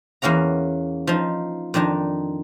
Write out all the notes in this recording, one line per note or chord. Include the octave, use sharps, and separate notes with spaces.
E2 A#3 C#4 F#5 A#5
F3 D#4
F2 D#3 D4 D#4